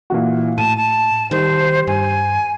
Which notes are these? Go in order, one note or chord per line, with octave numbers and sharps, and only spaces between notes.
A#2 E3 F#4
A2 A5 D#7
A5
D#3 G3 C5
G2 G#5